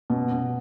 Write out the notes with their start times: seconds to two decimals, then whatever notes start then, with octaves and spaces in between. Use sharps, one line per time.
0.10 B2
0.32 B2